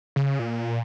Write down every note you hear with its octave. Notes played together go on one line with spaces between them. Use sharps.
C#3
A#2